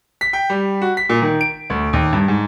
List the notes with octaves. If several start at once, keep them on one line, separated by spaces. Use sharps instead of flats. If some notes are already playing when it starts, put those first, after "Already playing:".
B6
G5
G3
F#4
B6
A#2
D#3
D7
D2
D#2
G2
G#2